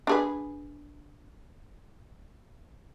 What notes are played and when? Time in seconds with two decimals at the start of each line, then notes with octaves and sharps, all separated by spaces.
0.07 D4 G#4 B4